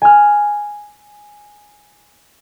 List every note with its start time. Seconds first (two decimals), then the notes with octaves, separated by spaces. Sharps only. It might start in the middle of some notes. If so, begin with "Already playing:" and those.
0.02 G#5 F6